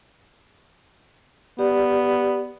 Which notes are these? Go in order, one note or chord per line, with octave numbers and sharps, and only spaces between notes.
B3 G4 D5